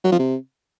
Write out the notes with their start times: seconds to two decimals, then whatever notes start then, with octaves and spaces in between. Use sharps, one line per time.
0.04 F#3
0.12 F3
0.19 C3